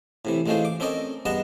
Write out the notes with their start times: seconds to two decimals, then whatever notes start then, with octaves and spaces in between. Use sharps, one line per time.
0.25 A2 C3 E3
0.46 A1 A2 G#3 A3 F4 C5
0.65 D6
0.80 C4 C#4 A4 A#4 D5 D#5
1.25 G2 G#3 B3 D#5 A5 A#5